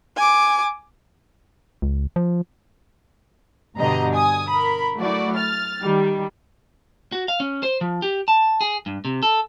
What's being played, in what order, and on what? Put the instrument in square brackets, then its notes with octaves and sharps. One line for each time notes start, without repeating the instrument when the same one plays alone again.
[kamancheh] G#5 D6
[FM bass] C#2
F3
[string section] G2 B2 D3 G4 D#5 A#5
G#5 D#6
A#4 B5
F#3 A3 E4 F#4 D5
F6 A6
D#3 G3 G4
[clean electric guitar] F#4
F5
C#4
C5
F3
G4
A5
G#4
G2
C3
A4